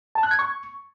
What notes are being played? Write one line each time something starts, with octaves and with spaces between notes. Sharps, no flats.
A5
F#6
G#6
C#6